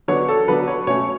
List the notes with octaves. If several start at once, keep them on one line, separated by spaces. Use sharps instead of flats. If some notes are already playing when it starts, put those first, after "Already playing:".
D3 F#3 B3 D4 C#5
A4
D3 F#3 B3 D4 B4
C#5
B2 A3 C#4 C#5